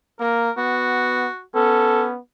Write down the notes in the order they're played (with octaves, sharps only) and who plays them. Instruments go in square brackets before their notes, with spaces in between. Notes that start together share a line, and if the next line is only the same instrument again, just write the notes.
[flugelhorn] A#3 [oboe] A#4
[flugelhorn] B3 [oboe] F#4
[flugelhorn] B3 [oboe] C#4 [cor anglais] A4